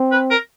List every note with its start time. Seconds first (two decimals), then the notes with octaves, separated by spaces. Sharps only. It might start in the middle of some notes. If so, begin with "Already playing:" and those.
Already playing: C4
0.12 B4
0.31 A#4